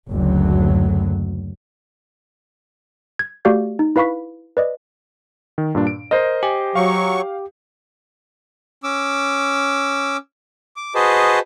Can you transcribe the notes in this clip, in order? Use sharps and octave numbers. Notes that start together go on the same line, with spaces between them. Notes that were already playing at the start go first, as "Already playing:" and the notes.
F#1 D2 F#3
G#6
A3 F#4 G4 D5 F5 G6
D#4
E4 B4 F5 B5 C#6 B6
B4 D5 D#5
D#3
G2 A#2 D4
D7
A#4 C5 D#5
G4 G#5
F#3 F5 C#6
C#4 D6 E6
D6
F#4 G#4 B4 C5 D#5 A5